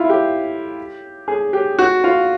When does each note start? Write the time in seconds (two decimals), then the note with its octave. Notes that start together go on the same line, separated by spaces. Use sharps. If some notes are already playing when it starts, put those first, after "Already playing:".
Already playing: E4 F4
0.10 G4
1.28 G#4
1.53 G4
1.79 F#4
2.04 F4